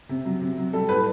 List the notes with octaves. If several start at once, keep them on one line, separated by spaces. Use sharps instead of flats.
C3
F#3
C3
F#3
G3 A4
A2 B4